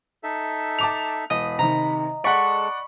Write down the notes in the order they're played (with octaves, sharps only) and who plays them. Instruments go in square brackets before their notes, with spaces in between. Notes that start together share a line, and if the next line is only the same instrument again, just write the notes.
[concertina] D#4 A4 E5
[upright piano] A5 D6 F7
[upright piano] E1 [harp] D#5 [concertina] B5
[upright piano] C3 D#3 [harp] A#5
[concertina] G#3 A4 [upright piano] D5 F#5 [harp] B5 C#6